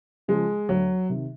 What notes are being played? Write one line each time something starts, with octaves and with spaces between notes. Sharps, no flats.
C#3 F3 G#3
D2 F#3
C3 D#3